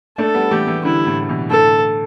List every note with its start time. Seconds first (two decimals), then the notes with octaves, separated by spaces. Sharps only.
0.18 A3 D4 A4
0.34 G3 B3
0.51 E3 A3 G4
0.67 E3 A3
0.85 D3 G3 E4
1.06 A2 D3
1.22 G3
1.29 B2 E3
1.50 A2 D3 A4